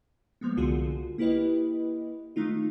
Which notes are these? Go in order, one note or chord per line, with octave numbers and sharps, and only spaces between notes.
F3 G3 G#3 A#3 B3
C2 D3 F4 F#4 G#4
A#3 E4 G4 B4 D#5
D#3 G#3 A3 D#4 F4